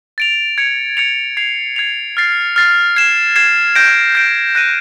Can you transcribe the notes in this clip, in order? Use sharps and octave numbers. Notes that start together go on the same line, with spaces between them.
A6 D7 F7
G#6 C#7 F7
G#6 C#7 F7
G#6 C7 F7
G#6 C7 F7
F6 A6 C7
F6 A6 C7
G#6 C7 E7
G#6 C7 E7
G6 A#6 D7
G6 A#6 D7
F#6 A#6 D#7